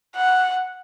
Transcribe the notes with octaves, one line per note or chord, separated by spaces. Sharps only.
F#5